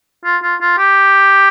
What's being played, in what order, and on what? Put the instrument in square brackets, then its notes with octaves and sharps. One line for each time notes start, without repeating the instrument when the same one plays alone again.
[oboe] F4
F4
F4
G4